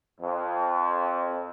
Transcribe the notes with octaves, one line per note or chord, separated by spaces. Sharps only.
F2